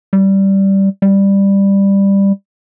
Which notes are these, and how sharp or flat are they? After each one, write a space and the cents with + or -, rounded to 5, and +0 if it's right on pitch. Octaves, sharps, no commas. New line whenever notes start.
G3 -10
G3 +10